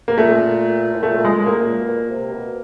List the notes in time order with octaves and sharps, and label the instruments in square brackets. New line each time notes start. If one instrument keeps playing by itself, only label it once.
[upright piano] A#3
[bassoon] A#2 [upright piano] A3
[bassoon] A2
[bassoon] A#2 [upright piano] A3
[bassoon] A#2
[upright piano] G#3
[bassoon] A2 [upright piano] A#3
[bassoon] A#2
B2
A#2
C3
B2